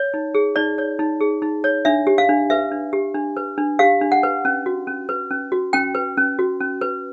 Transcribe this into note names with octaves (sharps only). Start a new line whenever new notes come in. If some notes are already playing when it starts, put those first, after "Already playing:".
Already playing: C#5
D#4
G#4
D#4 D5
C#5
D#4
G#4
D#4
C#5
D4 E5
G4
F5
D4
B4 E5
D4
G4
D4
B4
D4
G4 F5
D4
F#5
B4
C#4
F#4
C#4
B4
C#4
F#4
C#4 G5
B4
C#4
F#4
C#4
B4